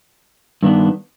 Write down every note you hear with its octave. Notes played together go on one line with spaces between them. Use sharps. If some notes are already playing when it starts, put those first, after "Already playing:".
G2 D#3 B3 D4